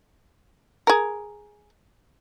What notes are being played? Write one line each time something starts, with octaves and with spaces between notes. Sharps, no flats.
G#4 A#4